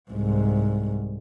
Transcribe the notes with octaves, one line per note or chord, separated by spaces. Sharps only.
C2 G#2